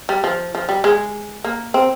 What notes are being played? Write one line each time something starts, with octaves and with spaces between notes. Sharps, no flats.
G3
F3
F3
G3
G#3
A#3
C4